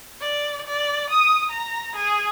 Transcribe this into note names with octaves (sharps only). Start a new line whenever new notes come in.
D5
D5
D#6
A#5
G#4